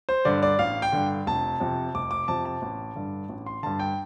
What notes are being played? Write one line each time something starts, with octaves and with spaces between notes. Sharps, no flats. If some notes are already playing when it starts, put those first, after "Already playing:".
C5
G2 D3 D5
D5
A1 F5
G5
G2 D3
F1 A5
F2 C3
F1 D6
D6
F2 C3 A5
A5
A1
G2 D3
A1
C6
G2 D3 A5
G5